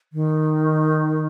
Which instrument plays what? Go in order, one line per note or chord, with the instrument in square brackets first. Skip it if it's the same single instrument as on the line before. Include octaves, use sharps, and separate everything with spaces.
[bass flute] D#3